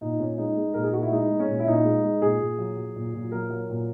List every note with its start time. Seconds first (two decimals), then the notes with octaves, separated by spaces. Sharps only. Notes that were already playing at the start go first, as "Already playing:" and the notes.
0.01 A#2 D#4
0.19 A#2 C#4
0.38 G#3 D#4
0.57 G#3
0.74 A#2 A#4
0.83 G#4
0.93 A#2 F#4
1.02 E4
1.11 G#3 D#4
1.31 G#3
1.39 C#4
1.48 A#2
1.59 E4
1.67 A#2 D#4
1.85 G#3
2.04 G#3
2.22 A#2 G#4
2.40 A#2
2.58 F#3
2.77 F#3
2.96 A#2
3.14 A#2
3.32 F#3 A#4
3.50 F#3
3.70 A#2